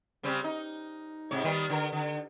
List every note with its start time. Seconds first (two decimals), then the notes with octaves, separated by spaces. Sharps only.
0.23 C#3 G3 C4
0.44 D#4
1.31 G#2 C3 C#5
1.44 D#3 G3 B3
1.69 D3 A#4
1.93 D3